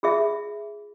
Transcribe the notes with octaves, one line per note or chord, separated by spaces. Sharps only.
F4 G#4 E5